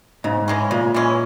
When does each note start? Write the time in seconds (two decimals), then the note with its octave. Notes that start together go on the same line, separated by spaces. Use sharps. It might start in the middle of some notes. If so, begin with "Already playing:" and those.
0.24 G#2 C#3
0.48 E3 G#3 C#4
0.71 A#2 C#3
0.94 E3 G#3 C#4